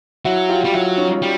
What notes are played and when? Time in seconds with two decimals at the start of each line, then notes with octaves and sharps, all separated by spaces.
0.25 F#3 E4 F#4
0.49 F4 G4
0.64 G3
0.73 F#3 E4 F#4
0.97 C#4 D#4
1.22 G3